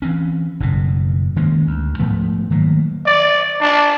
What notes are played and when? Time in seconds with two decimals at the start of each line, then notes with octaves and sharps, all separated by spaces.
0.02 E3 C4 C#4
0.60 F#1 G#2 B2
1.36 D#3 G#3 A#3 C#4
1.67 D2
1.99 G#2 F3 A3 B3
2.50 D#3 F#3 A3 A#3
3.06 D5
3.61 D4